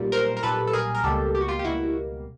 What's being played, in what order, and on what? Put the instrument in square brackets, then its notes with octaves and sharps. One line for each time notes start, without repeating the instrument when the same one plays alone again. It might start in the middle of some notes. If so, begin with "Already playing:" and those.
Already playing: [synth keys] B1 A#2 G3
A#4 C5
A#4
B1 A#2 G3 A4 B4
A4
G#4 A#4
A#4
C#2 B2 G3 A#3 G4 A4
G4
F#4
F4 G4
G4
C#2 B2 G3 A#3 E4 F#4